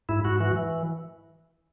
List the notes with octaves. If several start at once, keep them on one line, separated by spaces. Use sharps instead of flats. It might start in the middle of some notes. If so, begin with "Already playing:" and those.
G#2 E4
G#2 F#4
E3 F#4
E3